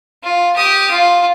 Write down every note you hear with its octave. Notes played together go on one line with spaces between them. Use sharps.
F4
G4 D#6
F4